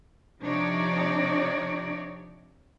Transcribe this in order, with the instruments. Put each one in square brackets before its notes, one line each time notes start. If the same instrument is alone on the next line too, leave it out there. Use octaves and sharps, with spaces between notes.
[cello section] C3 F3 D4 D#4 C#5 D5